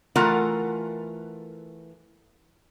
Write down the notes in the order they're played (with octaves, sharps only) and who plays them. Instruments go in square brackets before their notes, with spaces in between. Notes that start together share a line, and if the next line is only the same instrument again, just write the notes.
[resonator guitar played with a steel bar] E3 A3 F4 A#4 F#5 A#5